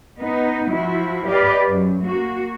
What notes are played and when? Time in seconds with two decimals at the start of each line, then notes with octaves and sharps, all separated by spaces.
0.21 B3 D#4
0.70 F3 E4 F#4
1.27 G4 B4 D5 D#5 F5
1.67 F#2
2.05 A#3 F#4